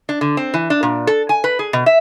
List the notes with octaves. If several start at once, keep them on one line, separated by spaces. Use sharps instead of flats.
D4
D3
C4
E3
D4
A#2
A4
G#5
B4
G#4
B2
E5